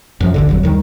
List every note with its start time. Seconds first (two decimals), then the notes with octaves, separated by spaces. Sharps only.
0.20 F#2 F3
0.34 A1 D2 D3
0.49 G1 F2 F#3
0.63 D2 D#3 G3